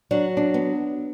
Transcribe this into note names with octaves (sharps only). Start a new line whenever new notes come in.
F#3 D4
D4
B3